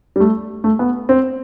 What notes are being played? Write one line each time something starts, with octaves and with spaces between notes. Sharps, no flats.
G3
A3
A3
B3
C4